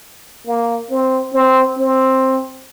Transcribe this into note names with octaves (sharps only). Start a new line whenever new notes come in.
A#3
C4
C4
C4